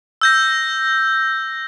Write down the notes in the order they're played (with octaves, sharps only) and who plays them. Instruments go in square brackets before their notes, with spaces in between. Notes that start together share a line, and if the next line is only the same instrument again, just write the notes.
[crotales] E6 G6 A#6